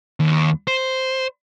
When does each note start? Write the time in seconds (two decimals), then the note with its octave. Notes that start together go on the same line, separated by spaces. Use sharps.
0.20 D#2
0.67 C5